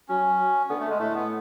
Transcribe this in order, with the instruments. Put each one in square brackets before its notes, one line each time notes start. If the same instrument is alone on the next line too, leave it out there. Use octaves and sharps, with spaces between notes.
[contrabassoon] F#3 [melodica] C#4
[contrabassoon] D3 [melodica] B3
[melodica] A3
G#3
[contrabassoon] A2 [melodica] A3
[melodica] B3